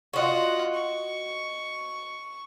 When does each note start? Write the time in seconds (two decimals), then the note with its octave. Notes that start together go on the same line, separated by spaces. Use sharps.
0.13 F4 F#4 D#5 F#5
0.74 C#6